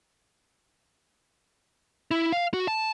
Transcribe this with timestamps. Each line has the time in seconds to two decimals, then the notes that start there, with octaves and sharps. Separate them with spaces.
2.11 E4
2.32 F5
2.54 F#4
2.68 A5